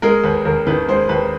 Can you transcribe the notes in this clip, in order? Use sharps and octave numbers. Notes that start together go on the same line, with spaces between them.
G#3 A#4
D#2 B4
D#2 A#4
D#3 B4
G#3 C5
D#2 B4